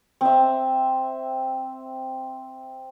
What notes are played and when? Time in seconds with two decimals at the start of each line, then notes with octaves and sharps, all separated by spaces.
0.21 C4 E5